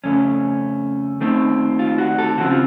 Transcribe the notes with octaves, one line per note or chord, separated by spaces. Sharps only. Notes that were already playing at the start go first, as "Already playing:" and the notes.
F2 C#3 A3 C#4
D#2 D#3 A3 C4
F4
F#4
A4
D#2 C#3 F3 C4 F#4
F4